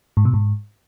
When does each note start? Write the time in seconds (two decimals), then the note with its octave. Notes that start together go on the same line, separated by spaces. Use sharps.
0.17 G#2
0.25 B2
0.34 G#2